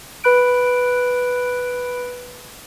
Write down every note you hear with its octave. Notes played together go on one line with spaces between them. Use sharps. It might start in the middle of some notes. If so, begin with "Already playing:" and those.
B4 B5 F#6 D7